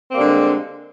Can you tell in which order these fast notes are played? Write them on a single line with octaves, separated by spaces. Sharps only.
C4 A#3 G3 D3 G#3